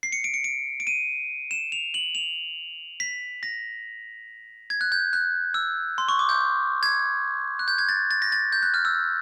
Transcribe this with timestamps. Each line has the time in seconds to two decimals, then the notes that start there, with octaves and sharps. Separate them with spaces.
0.03 C7
0.12 C#7
0.24 D7
0.34 C#7
0.44 D7
0.80 D7
0.87 D#7
1.51 E7
1.72 F7
1.94 F#7
2.15 F7
3.00 B6
3.43 A#6
4.70 G#6
4.81 F#6
4.92 G6
5.13 F#6
5.54 E6
5.98 C6
6.09 C#6
6.19 D6
6.29 G6
6.83 G#6
7.59 F#6
7.68 G6
7.78 G#6
7.89 A6
8.11 A6
8.22 A#6
8.32 A6
8.52 G6
8.63 F#6
8.74 F6
8.85 E6